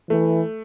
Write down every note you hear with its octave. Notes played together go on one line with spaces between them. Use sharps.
E3 A3